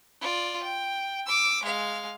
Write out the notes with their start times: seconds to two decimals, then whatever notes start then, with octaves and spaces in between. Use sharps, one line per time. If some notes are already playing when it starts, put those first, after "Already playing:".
0.21 F4 D5
0.63 G5
1.26 D6 E6
1.63 G#3 F5